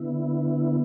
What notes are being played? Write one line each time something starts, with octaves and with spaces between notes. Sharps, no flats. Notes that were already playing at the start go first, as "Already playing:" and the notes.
Already playing: D3 B3 E4